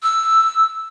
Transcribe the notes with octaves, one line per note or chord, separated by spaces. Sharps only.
E6